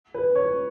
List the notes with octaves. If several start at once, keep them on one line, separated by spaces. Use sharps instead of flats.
B4
C#5